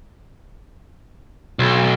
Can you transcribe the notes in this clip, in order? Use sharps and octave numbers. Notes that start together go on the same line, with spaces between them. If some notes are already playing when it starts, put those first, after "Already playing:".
B1